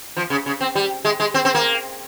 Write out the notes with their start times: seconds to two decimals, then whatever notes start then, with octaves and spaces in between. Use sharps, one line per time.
0.17 F3
0.30 C#3
0.46 C#3
0.61 C4
0.75 G3
1.05 G#3
1.20 G#3
1.34 C4
1.45 C4
1.55 A#3